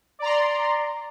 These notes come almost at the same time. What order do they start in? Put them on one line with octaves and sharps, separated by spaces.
D5 A#5 C6